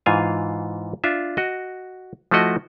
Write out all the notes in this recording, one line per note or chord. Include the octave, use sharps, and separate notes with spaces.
G#2 E3 F4 F5 G#5
D4 F4 E5
F#4 D#5
F3 A3 E4 F#4 D#5